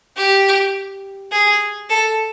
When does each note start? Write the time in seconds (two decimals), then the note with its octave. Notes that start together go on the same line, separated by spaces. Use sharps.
0.17 G4
1.32 G#4
1.90 A4